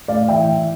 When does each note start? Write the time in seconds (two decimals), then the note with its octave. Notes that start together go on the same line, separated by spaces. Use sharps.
0.08 A2 D5 F5
0.28 E3 E5 G5
0.49 E3